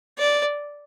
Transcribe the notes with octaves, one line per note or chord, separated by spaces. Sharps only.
D5